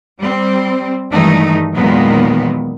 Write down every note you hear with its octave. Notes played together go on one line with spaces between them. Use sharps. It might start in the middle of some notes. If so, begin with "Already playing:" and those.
G3 C4
G2 D#3 E3 G#3 A3 D#4
E2 A#2 D#3 F#3 G#3 B3